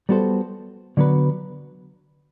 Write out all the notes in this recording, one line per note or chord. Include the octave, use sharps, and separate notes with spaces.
G3 B3 F#4 A4 C5
D3 F#3 B3 F#4 B4